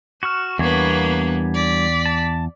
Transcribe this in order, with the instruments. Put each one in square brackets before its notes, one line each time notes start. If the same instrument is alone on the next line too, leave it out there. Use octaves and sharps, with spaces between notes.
[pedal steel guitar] F#4 C#6 F6 [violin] E7
[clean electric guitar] E2 [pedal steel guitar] G3 D4 C#5 [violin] A#3 B3
[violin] D5 B6
[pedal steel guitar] A5